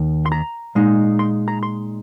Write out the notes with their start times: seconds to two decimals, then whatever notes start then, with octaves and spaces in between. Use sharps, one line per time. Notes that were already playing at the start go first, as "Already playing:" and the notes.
Already playing: D#2 D#3
0.26 C6
0.32 A#5
0.75 A#2 G#3 D#4
1.19 C6
1.48 A#5
1.63 C6